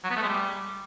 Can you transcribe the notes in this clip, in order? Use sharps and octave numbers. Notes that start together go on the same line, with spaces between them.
F#3
B3
A3
G#3
G3